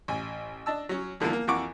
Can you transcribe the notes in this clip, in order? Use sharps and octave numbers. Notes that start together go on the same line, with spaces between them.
A1 G#5
D4 D#5 A5 E6
F#3 C#4
E2 D3 E3 F3 A#3
A#3
F2 E3 A#4 F#5 C#6 D6